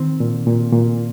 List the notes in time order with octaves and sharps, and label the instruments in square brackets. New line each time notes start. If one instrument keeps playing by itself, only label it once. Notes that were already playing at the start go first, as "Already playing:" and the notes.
Already playing: [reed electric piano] D#3 C4
A#2
A#2
A#2